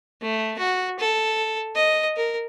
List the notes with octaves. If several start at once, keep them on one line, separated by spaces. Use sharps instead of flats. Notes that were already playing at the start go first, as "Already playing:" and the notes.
A3
F#4
A4
D#5
A#4